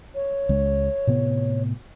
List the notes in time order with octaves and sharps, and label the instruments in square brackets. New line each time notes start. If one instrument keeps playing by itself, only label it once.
[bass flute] C#5
[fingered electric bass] C#2 G#3
A2 C3 B3